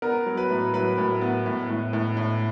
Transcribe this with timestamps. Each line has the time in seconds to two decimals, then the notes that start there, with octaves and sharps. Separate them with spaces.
0.02 B3 A#4
0.26 F#3
0.37 B4
0.50 A2
0.73 F#3 B4
0.98 A2
1.21 B3
1.46 A2
1.70 A2
1.93 A2
2.17 A2